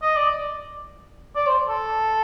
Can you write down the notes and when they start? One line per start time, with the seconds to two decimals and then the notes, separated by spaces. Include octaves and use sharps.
0.02 D#5
0.16 D5
1.35 D5
1.47 C5
1.69 A4